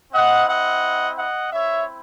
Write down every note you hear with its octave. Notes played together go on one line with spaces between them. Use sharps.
C4 E4 D#5 F#5
D#5 F#5
D#5 F#5
C4 E4 C#5 E5